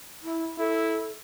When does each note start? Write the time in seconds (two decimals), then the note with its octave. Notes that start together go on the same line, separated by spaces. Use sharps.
0.23 E4
0.58 E4 A4